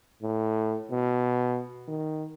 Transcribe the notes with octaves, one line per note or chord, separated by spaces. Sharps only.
A2
B2
D#3